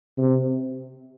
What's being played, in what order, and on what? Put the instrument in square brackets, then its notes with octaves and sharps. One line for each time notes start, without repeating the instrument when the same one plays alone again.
[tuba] C3